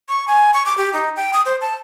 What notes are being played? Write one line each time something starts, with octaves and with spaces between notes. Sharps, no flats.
C#6
G#5
C#6
D6
G4
D#4
G5
D#6
C5
A5